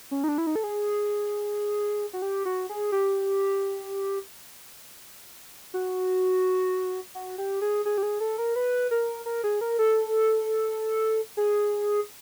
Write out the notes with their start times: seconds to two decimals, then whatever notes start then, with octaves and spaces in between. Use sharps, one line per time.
0.11 C#4
0.24 D#4
0.29 D4
0.38 E4
0.47 D#4
0.56 A4
0.64 G#4
2.13 F#4
2.22 G4
2.45 F#4
2.69 G#4
2.92 G4
5.74 F#4
7.15 F#4
7.38 G4
7.61 G#4
7.85 G#4
7.98 G4
8.03 G#4
8.20 A4
8.38 A#4
8.56 B4
8.91 A#4
9.26 A#4
9.44 G#4
9.61 A#4
9.79 A4
11.37 G#4